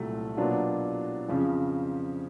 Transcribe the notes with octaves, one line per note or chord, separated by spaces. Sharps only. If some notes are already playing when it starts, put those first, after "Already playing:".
Already playing: C2 A#2 F#3 A3
B2 F#3 A#3 D4 F4
F2 C#3 F3